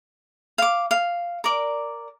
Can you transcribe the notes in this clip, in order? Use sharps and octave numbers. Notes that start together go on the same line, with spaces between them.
F5 D6
F5
A#4 D5